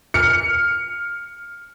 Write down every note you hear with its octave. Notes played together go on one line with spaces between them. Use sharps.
F6 C#7